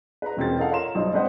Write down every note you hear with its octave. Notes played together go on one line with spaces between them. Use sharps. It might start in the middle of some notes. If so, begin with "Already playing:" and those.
B4 A#5
E1 B2 C4 C#4 A#4 A6
D#4 A4 A#4 F5 F#5
C#5 F5 A#5 C6 E7
B1 G2 D#4 C5
G#3 C4 B4 C5 D#5 F#5